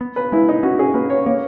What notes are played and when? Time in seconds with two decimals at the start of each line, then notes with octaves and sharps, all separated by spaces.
0.01 B3
0.16 B4
0.32 G#3 E4
0.49 D#4
0.63 C#4 F#4
0.79 G#4
0.94 A#3 B4
1.10 C#5
1.26 A#3 C#5